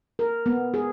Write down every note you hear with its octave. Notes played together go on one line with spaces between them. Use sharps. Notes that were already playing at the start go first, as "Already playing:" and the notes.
A#4
B3
G#4